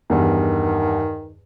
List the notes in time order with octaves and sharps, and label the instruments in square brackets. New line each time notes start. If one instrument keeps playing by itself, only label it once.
[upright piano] E2 G2 [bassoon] D#3